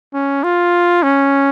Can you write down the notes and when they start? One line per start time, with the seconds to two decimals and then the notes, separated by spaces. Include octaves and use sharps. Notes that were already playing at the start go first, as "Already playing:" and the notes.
0.14 C#4
0.44 F4
1.03 C#4